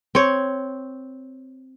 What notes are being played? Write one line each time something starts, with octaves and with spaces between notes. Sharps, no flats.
C4 C#5